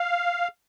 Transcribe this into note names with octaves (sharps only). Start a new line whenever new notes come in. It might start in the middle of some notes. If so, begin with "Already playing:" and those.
Already playing: F5